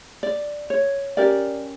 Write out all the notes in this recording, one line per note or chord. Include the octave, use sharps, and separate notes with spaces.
D5
C#5
C#4 G4 A#4 D5